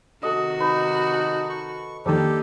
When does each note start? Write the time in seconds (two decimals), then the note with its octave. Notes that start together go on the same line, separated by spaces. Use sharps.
0.23 C3 D#3 F#4 A4 D#5
0.60 D#4 B4
1.13 A5
1.49 C#6
2.06 F2 D#3 A#3 D4 D#4 G4 A4